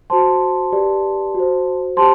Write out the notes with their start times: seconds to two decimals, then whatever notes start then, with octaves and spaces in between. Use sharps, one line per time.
0.10 F#4 C5 A5 C6
0.72 G4 B4 D5
1.34 F#4
1.40 C5
1.96 G4 C5 A5 C6